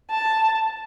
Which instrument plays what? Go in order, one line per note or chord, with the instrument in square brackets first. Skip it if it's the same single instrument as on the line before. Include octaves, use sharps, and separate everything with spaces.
[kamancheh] A5